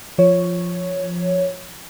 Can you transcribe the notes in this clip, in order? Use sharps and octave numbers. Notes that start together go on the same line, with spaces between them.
F3 C#5